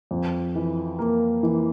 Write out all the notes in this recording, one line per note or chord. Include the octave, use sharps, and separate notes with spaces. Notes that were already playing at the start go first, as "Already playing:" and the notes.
F2
E3
A#3
E3